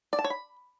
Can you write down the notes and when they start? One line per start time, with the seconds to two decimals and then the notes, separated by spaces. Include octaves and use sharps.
0.13 D5
0.19 A5
0.24 C#5
0.30 B5